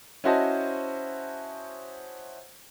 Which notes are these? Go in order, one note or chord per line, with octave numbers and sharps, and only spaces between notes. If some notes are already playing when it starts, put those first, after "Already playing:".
C#4 E4 F#4 C5 D#5 A5